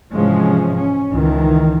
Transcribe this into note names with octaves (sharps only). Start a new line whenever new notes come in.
G#2 C3 E3 F3 G#3 C#4
C#4
C#2 D#3 E3